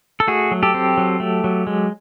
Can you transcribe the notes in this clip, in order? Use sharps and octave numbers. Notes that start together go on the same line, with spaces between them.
A4
A3 F#4 G#4
F#3
G4 A4
C4
F#3
A3
F#3
G#3